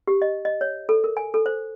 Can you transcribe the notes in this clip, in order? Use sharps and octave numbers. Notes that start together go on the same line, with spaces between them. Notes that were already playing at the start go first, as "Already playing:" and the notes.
G4
D#5
D#5
C#5
A4
A#4
G#5
A4
C5